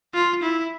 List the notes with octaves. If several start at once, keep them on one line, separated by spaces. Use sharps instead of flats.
F4
E4